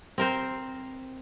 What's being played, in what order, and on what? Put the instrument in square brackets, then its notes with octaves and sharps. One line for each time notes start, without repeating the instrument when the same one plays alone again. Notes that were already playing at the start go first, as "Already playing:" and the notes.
[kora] C4 A#4 C5